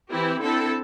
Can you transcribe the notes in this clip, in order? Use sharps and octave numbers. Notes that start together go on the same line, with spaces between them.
E3 C4 E4 G4
D3 C4 E4 A4